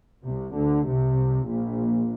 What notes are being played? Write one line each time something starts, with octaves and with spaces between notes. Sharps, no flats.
C2 C3
D2 D3
C2 C3
A#1 A#2